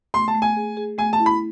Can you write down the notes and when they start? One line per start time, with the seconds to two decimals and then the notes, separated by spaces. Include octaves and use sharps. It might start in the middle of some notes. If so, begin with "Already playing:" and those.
0.14 A3 C6
0.28 A5
0.34 A3
0.42 G#5
0.57 G#4
0.77 G#4
0.98 A3 G#5
1.13 A5
1.19 E4
1.26 B5